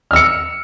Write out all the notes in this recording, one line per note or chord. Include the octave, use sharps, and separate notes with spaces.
E6 F6 C#7